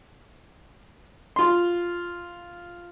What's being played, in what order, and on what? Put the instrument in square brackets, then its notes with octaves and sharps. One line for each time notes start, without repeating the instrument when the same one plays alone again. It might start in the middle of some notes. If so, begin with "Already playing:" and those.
[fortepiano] F4 C6